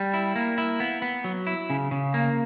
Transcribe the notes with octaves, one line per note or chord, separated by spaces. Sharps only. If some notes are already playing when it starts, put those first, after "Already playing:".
Already playing: G3
E4
A#3
E4
B3
B3
F#3
E4
C#3
C#3
A#3